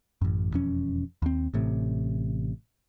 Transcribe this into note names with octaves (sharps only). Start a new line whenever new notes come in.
A1 F#2
E1 F2 C#4
D#2 C4
A1 A2 C3